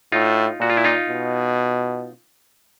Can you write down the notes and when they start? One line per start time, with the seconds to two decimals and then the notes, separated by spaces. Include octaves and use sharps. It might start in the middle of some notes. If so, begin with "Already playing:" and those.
0.12 A2 D#4 F4
0.60 A#2 F#4
0.70 F4
0.77 E4
0.84 D#4 F4
1.09 B2